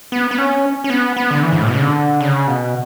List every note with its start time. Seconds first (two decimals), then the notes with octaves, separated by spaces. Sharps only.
0.12 B3
0.31 B3
0.38 C#4
0.84 C#4
0.90 B3
1.16 B3
1.31 D3
1.43 E3
1.52 G#2
1.59 A2
1.67 B2
1.74 C#3
1.81 D3
2.21 C#3
2.47 B2